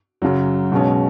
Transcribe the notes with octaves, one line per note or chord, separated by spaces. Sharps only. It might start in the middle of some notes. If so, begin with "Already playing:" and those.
F#2 C#3 F#3
B1 B2 G#3 C#4